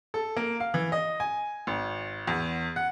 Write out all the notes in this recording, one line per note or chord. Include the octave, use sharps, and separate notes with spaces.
A4
A#3
F5
E3
D#5
G#5
G#1
E2
F#5